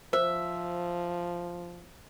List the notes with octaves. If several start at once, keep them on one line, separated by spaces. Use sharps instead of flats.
F3 C5 E5